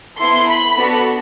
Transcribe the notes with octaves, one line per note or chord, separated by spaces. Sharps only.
B3 E4 A4 C6
B5
B3 D4 F#4 A4